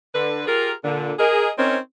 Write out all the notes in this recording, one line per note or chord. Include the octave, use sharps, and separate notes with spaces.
D3 B4
F4 G4 G#4 A#4
A#2 D3
G#4 A#4 D#5
C4 C#4 D#4 A#4 C5 C#5